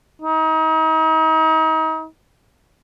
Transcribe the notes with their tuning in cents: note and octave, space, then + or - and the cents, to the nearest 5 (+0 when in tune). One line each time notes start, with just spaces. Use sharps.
D#4 +35